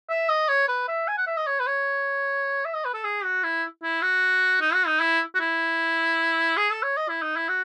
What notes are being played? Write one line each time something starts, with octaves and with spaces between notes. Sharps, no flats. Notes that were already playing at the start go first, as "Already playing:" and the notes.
E5
D#5
C#5
B4
E5
G#5
F#5
E5
D#5
C#5
B4
C#5
E5
D#5
B4
A4
G#4
F#4
E4
E4
F#4
D#4
F#4
D#4
E4
F#4
E4
G#4
A4
C#5
D#5
E4
D#4
E4
F#4